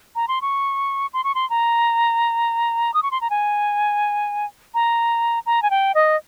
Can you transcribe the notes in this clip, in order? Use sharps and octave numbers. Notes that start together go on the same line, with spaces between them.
A#5
C6
C#6
C6
C#6
C6
A#5
D#6
C#6
C6
A#5
G#5
A#5
A#5
G#5
G5
D#5